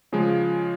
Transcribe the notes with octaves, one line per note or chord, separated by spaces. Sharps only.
C#3 F3 G#3